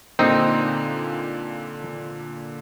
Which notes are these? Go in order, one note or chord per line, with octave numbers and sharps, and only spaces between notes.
A#2 D3 A#3 C4 D#4